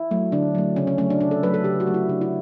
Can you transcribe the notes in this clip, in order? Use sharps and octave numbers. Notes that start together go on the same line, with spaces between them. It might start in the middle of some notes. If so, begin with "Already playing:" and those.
Already playing: E4
F#3 A3
D3 D4
F#3 A3
C#3 C#4
C#4
F#3 A3 C#4
D4
C#3 D4
A4
F#3 A3 B4
A4
C#3 G4
F#4
F#3 A3
E4
C#3 D4
E4